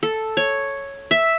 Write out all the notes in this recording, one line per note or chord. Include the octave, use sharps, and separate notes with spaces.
A4
C#5
E5